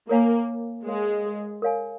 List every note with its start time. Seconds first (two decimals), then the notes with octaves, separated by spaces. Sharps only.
0.09 A#3 A#4 C#5 F5 G#5
0.85 G#3 A#4 C#5 F5 G#5
1.62 A#4 C#5 F5 G#5